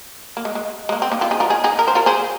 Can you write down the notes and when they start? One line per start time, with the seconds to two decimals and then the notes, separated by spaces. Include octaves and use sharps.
0.37 A#3
0.45 G#3
0.55 G#3
0.89 G#3
0.92 A#3
1.02 C4
1.12 A#3 D#4
1.21 C4 F4
1.31 D#4 G#4
1.40 F4 A#4
1.50 D#4 G#4
1.64 D#4 G#4
1.79 A#4
1.88 C5
1.95 F4 A#4
2.06 G#4 C5